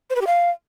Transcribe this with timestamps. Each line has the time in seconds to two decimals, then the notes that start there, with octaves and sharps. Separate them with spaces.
0.10 C5
0.16 B4
0.21 G4
0.27 F5